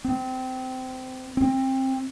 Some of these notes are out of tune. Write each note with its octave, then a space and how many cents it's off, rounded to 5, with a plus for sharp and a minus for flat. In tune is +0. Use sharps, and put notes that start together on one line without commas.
C4 -20
C4 +20